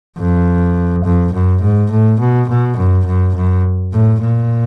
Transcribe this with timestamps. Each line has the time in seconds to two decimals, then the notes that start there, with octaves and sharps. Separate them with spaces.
0.18 F2
1.05 F2
1.34 F#2
1.62 G#2
1.91 A2
2.20 B2
2.49 B2
2.78 F#2
3.06 F#2
3.36 F#2
3.93 A2
4.22 A#2